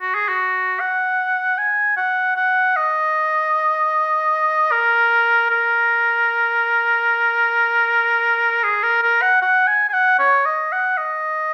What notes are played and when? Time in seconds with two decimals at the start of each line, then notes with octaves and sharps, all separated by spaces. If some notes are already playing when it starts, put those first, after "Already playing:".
0.01 F#4
0.15 G#4
0.28 F#4
0.80 F#5
1.58 G#5
1.97 F#5
2.36 F#5
2.76 D#5
4.71 A#4
5.50 A#4
8.63 G#4
8.83 A#4
9.02 A#4
9.22 F#5
9.42 F#5
9.67 G#5
9.89 G#5
9.93 F#5
10.19 C#5
10.46 D#5
10.72 F#5
10.97 D#5